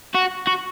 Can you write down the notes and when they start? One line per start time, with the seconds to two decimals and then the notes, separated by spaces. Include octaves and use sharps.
0.15 F#4
0.47 F#4